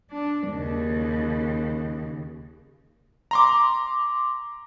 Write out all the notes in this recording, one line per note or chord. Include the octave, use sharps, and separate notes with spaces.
D4
D#2 C#3
A#5 C6 D6